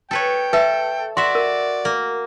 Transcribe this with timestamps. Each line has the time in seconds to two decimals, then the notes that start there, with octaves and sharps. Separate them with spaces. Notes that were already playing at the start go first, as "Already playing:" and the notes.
0.11 A4 B4 C#5 G5
0.53 A4 B4 E5
1.17 F#4 D5 E5 C6
1.35 A#4
1.85 A#3